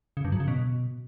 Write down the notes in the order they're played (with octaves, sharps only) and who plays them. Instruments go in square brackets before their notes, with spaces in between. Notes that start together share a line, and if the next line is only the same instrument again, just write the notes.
[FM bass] C#3
G2
F#3
C#3
B2